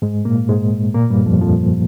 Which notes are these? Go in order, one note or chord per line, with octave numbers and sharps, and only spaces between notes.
G#2 G#3
A#2 A#3
G#2 G#3
A#2 A#3
G2 G3
F2 F3
F2 F3